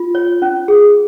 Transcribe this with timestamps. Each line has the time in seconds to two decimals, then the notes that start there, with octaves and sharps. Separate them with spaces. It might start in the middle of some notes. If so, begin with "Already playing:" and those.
Already playing: F4
0.15 C#5
0.42 C#4
0.68 G#4